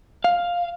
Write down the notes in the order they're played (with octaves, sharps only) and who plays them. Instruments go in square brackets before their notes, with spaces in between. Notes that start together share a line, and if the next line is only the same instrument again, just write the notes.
[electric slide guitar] F5